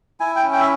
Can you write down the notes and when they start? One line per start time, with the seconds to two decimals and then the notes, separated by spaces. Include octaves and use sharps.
0.20 E4 G#5
0.36 G5
0.44 C#4
0.52 G5
0.60 E5